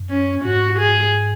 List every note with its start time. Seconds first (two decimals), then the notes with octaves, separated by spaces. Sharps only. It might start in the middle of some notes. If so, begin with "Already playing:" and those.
Already playing: F#2
0.09 C#4
0.44 G#2 F#4
0.79 G#4